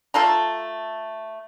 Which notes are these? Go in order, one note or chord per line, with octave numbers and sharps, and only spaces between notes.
A3 F4 A4 A#5